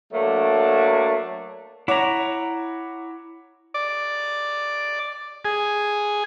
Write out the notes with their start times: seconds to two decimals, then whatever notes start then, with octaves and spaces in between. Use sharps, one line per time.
0.13 F#3 A3 A#3 D4
1.88 E4 C#5 F#5 A#5 D6
3.74 D5
5.45 G#4